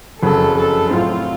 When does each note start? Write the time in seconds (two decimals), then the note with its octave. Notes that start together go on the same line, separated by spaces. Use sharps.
0.22 F#1 F2 C#3 F#3 A4
0.57 A4
0.90 A2 F#3 C4 F4